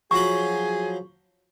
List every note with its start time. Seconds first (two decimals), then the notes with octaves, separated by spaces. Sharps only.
0.11 F3 F#3 G#4 B5 C#6